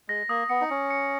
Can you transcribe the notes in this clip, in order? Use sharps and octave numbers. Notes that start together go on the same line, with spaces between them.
G#3 A#6
A#3 D#6
B3 C#7
D#4
C#4 C#7
C#7